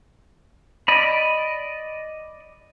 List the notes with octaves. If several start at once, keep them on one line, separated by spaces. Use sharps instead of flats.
D5 D#5 B5